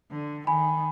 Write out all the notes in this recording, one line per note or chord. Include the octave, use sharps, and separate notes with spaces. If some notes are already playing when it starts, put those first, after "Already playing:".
D3
D#3 G#5 B5